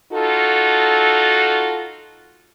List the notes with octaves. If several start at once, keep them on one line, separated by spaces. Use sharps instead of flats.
D#4 F4 F#4 A4